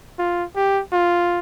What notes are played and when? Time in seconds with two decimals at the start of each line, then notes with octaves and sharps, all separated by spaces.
0.19 F4
0.56 G4
0.93 F4